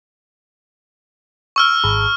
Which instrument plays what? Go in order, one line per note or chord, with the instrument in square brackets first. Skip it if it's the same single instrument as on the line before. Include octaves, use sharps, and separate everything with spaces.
[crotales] C#6 E6 F6
[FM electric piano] G#1